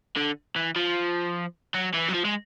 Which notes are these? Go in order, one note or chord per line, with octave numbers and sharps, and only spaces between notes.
D3
E3
F3
F#3
E3
F#3
F3
G#3